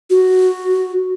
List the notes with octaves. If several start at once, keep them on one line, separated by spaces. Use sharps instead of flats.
F#4